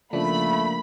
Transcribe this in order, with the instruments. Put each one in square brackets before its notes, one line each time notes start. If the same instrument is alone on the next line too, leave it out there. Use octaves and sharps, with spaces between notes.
[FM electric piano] C#3 F3 D4 [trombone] A3 [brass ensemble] A#3 [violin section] B5